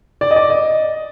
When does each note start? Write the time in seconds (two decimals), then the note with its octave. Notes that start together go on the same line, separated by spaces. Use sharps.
0.21 D5
0.31 D#5
0.36 D5
0.50 D#5